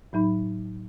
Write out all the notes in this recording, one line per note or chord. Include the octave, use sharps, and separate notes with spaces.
A2 F#3 D#4 B5